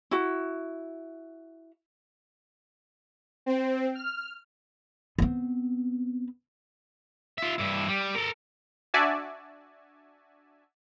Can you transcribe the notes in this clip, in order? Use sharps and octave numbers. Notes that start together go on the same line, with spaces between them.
E4 F#4
C4
F6
B3 C4
F4 E5
G2 E4
G3
A4 A#4
D4 F#4 D5 E5 G#5 A5